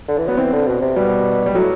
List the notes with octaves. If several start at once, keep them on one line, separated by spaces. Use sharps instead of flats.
D3
E3
F#3 B3
E3 C4
D3
B2
C3
B2 G3
G3
A2 F#3